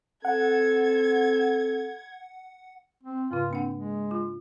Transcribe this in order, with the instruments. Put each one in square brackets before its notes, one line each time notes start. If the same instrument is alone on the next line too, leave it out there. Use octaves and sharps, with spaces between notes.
[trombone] C4 [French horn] A4 [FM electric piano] F#5 [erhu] G#6
[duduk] C4
[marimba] G#2 C#3 [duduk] F4
[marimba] A#3 D4 F#5 [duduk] C4
[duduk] G#3
[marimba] F4